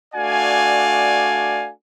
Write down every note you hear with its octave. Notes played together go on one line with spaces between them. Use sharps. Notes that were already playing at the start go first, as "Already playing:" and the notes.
A3 D4 F#4 D5 F5 G#5